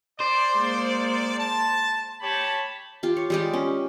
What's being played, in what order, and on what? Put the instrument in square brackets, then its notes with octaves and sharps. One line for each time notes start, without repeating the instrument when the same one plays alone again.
[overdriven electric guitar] C5 [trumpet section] D5
[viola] G#3 A#3
[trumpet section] A5
[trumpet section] G4 C#5 [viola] A5 B5
[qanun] F4 G4
C#5
G3 G#3 G4
C#4